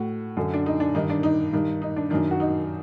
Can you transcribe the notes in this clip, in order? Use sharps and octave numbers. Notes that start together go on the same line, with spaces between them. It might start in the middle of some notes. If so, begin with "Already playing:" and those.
Already playing: A2 F#4
F#2 D3
D4
D#4
D4
G2 D#3 D#4
D4
D#4
G2 D#3
D#4
D4
F#2 D#3 D4
F#4
D#4